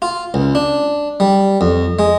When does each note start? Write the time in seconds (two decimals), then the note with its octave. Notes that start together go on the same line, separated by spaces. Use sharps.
0.02 F4
0.34 C#2
0.55 D4
1.20 G3
1.61 F2
1.99 G#3